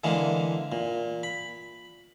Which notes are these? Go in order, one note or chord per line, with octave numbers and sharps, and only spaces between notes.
D3 E3 G#3 A#3
A#2
B5